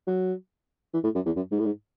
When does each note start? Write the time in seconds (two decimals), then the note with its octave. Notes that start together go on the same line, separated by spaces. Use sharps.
0.07 F#3
0.94 E3
1.04 A2
1.15 F#2
1.26 E2
1.36 F#2
1.51 G#2
1.59 A2
1.65 G#2